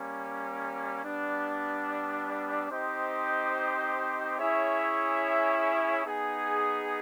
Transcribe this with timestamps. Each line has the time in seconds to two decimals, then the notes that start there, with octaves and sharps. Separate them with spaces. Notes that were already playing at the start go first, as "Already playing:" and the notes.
Already playing: G3 A#3 C#4
1.01 G3 B3 D4
2.69 C4 D#4 G4 C5 D#5
4.38 C#4 E4 G#4 C#5 E5
6.05 B3 D#4 G#4